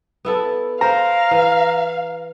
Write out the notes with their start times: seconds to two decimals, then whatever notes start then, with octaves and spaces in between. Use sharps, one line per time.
0.25 B3 E4 A4
0.81 A#4 C5 F5 A#5
1.31 E3